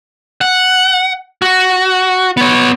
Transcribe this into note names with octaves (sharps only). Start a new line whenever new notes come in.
F#5
F#4
B3 C#5